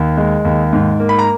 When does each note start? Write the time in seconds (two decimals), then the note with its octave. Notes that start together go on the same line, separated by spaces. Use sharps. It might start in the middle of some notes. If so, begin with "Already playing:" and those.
Already playing: D#2
0.17 G#3
0.45 D#2
0.73 G#2
1.00 A#3
1.09 B5
1.19 A#5